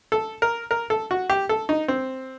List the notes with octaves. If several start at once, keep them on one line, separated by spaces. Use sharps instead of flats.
A4
A#4
A#4
A4
F#4
G4
A4
D#4
C4